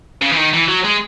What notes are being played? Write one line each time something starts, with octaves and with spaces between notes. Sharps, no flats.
C#3
E3
D#3
E3
F#3
G#3